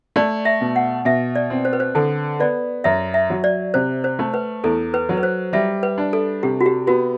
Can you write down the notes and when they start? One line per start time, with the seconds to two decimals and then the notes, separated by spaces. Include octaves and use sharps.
0.16 A3 D5
0.45 E5
0.61 B2
0.76 F#5
1.05 B2 E5
1.36 D5
1.50 C4
1.65 C5
1.73 B4
1.80 C5
1.95 D3 A4
2.40 B3 D5
2.84 F#2 E5
3.14 E5
3.30 F#3
3.44 D5
3.74 C3 C5
4.04 C5
4.19 A3
4.34 B4
4.64 E2 A4
4.94 B4
5.09 F#3
5.17 B4
5.23 C5
5.53 G3 E5
5.83 B4
5.98 D4
6.13 A4
6.43 C3 G4
6.61 F#4
6.66 G4
6.87 B3 F#4